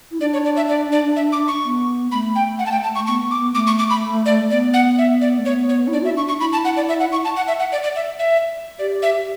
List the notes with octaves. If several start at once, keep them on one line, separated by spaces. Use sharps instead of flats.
E4
D4 D5
C#5
D5
E5
D5
D5
E5
D6
C#6
B3
A3 B5
G5
F#5
A5
G5
A5
C#6
B3 C#6
B3
D6
B3
A3 D6
C#6
D6
B5
D5
B3 D5
F#5
E5
D5
A3
B3 C#5
C#5
E4
D4 D5
F#4
E5
E4
D4 C#6
C#6
E4 B5
A5
F#5
D5
E5
F#5
C#6
A5
F#5
E5
F#5
D5
D5
E5
E5
G4 D5
E5